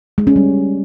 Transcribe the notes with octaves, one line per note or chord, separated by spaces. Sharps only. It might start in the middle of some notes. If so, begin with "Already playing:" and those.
G#3
C#4
G3